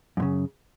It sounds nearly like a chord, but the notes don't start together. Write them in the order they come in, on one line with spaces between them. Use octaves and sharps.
F#2 A#2 C#3